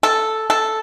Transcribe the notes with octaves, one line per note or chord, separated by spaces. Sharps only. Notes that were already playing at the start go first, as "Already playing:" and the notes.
A4
A4